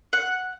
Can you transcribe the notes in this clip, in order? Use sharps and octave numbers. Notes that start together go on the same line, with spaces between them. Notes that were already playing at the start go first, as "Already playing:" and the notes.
F#5